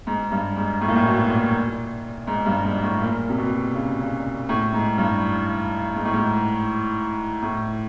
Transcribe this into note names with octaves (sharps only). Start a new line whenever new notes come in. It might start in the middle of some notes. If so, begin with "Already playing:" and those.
G#2
G2
G#2
A2
A#2
A2
B2
A#2
G#2
G2
G#2
A2
A#2
C3
B2
C#3
C#3
A2
G#2
G2
G#2
A2
G#2
A2